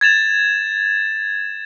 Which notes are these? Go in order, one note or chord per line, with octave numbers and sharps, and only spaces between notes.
G#6 A6 E7 F7